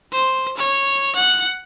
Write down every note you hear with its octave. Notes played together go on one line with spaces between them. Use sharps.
C5
C#5
F#5